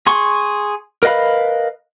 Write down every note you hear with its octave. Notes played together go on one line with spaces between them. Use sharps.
G#4 C6 C#6
A#4 B4 D#5 F5 B5